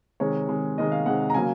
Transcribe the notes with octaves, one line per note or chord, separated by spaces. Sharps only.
C3 D#3 G#3 C#5
C3 D#3 G#3
C3 D#3 G#3 D#5
F5
C3 D#3 G#3 F#5
A#5
C#3 F#3 A#3 G#5